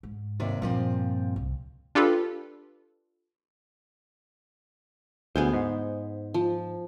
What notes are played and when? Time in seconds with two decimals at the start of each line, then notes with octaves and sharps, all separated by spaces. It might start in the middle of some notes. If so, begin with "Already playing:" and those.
0.03 G#2
0.40 D#2 C3 D5
0.62 G2 A#2 F3 C4
1.36 C2
1.95 D4 F4 G4 A4 B4
5.36 D2 B3 G#4 C5
5.54 G#2
6.34 F3